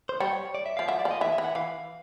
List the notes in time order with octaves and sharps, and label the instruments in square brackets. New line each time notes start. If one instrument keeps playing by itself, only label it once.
[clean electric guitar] C5
[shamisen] G3 [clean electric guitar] C#5
[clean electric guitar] D5
E5
[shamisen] F3 [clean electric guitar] F5
[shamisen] F#3 [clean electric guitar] E5
[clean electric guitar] D5
[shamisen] F3
[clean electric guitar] D#5
[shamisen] E3 [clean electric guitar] E5
[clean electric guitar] E5
[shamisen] E3
[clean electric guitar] F#5
[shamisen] E3 [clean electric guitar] F5